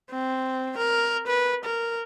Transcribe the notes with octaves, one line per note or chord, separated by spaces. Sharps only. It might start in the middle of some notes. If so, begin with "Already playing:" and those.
C4
A#4
B4
A#4